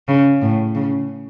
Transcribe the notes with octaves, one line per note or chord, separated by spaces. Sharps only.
C#3
A2
C#3